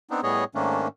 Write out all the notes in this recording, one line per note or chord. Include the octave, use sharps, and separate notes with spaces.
B3 C4 D4 D#4
A2 G3 B3 G#4 C#5 D#5
G#2 D#3 A3 A#3 C#4 D4